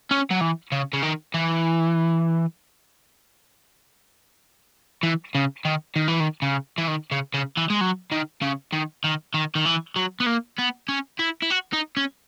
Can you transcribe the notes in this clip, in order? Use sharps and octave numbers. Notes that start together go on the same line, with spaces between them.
C#4
F#3
E3
C#3
C#3
D#3
E3
E3
C#3
D#3
D#3
E3
D#3
C#3
E3
D#3
C#3
C#3
E3
G#3
F#3
D#3
C#3
D#3
D#3
D#3
D#3
E3
F#3
B3
A#3
B3
C#4
E4
E4
F#4
D#4
C#4